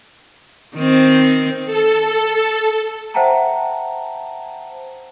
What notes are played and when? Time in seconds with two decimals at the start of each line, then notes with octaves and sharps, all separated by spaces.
0.76 D#3 C4
1.66 A4
3.14 C5 E5 F#5 G5 A5 A#5